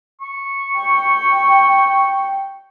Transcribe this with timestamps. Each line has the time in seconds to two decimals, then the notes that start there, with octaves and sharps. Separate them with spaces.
0.21 C#6
0.80 G5